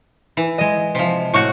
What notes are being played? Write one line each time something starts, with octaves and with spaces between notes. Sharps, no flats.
E3
G#3 D#5
C3 F3
A2 F#4 C#6